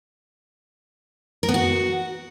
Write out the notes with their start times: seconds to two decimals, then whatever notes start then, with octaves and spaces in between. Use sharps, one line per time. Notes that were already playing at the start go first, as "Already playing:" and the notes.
1.43 A#4
1.49 B3
1.54 F#4